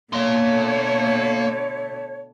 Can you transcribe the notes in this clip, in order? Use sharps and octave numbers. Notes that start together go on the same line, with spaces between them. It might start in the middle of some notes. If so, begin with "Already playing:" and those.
B2 D3 A3 A#3 C#5 C6